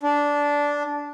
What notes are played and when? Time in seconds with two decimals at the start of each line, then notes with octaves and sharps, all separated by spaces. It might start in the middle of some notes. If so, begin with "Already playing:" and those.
0.03 D4